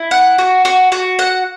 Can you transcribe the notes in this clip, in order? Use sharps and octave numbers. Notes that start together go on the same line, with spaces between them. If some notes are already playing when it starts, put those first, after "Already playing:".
Already playing: E4
F#5
F#4
F#4
F#4
F#5